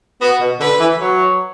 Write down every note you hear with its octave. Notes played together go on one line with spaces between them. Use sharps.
B3 F#4
B2
D3 B4
E3
F#3